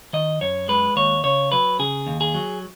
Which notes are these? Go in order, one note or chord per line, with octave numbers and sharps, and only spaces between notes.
D#3 D#5
F#2 C#5
G#3 B4
D#2 C#5
C#3 C#5
F#3 B4
C#3 G#4
D#2
G#4
F#3